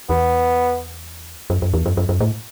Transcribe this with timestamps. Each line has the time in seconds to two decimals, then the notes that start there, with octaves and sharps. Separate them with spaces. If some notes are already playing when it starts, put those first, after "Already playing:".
0.09 E2 B3
1.50 F#2
1.62 F#2
1.74 E2
1.86 F#2
1.97 F#2
2.09 F#2
2.20 A2